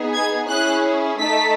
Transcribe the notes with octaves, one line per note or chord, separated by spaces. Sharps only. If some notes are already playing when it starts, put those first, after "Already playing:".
Already playing: B3 D#4 G#4
G#6
C#4 E4 G#4 F#6
A3 D#4 A4 B6